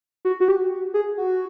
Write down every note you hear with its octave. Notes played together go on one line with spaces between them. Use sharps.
F#4
F#4
G4
G#4
F#4